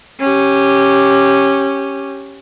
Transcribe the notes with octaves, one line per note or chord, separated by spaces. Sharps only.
C#4 G4